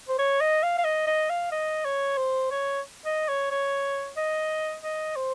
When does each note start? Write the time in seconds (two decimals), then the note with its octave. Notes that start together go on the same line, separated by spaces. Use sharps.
0.08 C5
0.19 C#5
0.41 D#5
0.63 F5
0.78 F5
0.85 D#5
1.07 D#5
1.30 F5
1.52 D#5
1.85 C#5
2.17 C5
2.51 C#5
3.06 D#5
3.28 C#5
3.51 C#5
4.17 D#5
4.83 D#5
5.16 C5